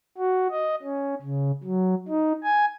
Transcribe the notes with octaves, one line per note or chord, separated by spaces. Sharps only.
F#4
D#5
C#4
C#3
F#3
D#4
G#5